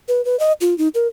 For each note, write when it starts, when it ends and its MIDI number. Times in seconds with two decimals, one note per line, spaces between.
0.08 0.24 71
0.25 0.38 71
0.40 0.53 75
0.61 0.76 65
0.78 0.88 63
0.95 1.07 70